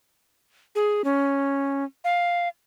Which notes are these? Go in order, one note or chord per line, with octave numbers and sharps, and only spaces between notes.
G#4
C#4
F5